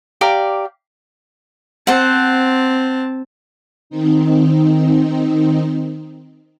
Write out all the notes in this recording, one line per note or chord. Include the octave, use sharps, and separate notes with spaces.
G4 D5 F5 A#5
C4 C5 F#5 A5
D#3 C4 D#4